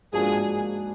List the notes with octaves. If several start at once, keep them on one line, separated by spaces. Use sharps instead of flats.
G#2 F3 A#3 D4 F#4 G#4